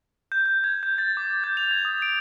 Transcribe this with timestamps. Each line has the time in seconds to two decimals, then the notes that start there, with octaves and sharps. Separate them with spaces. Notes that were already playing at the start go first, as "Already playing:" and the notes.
0.32 G6
0.46 G6
0.64 G#6
0.83 G6
0.98 A6
1.17 D6
1.44 G6
1.57 F7
1.71 G#6
1.85 D#6
2.02 D7